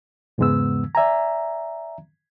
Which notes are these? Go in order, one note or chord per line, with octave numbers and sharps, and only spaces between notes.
E2 G#2 C#3 G#3 B3 E6
D5 E5 G#5 A#5